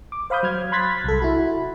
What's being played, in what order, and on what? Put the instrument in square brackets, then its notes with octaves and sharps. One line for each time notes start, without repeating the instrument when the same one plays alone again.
[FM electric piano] D6
C5 F5 B5 D#6 G6
F#3 F6 G#6
B5 C6 F#6 G#6 A6 B6
C2 A4
E4 F#4 B5